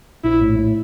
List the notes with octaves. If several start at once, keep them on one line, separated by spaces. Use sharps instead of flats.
A#1 E4
A2
A2